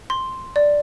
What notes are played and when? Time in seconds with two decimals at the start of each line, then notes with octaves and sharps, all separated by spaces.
0.10 C6
0.56 D5